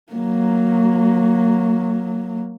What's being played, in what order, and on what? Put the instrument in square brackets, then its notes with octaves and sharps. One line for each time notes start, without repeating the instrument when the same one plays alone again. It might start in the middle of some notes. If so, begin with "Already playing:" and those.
[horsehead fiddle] F#3 A#3